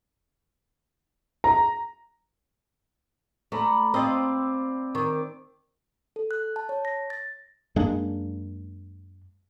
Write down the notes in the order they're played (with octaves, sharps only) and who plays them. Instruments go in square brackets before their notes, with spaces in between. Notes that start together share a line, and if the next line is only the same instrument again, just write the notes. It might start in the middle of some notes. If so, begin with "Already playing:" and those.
[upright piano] A#5
[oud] A3 [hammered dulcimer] D5 A#5 B5
[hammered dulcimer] C4 D5 [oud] F4 D#5
[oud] D#3 [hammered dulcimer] D6
[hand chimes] A4
F#6
A5
C#5
A#6
A6
[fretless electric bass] F#2 G#3 A#3 D4